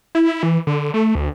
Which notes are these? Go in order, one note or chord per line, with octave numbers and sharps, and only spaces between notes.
E4
E3
D3
A3
D2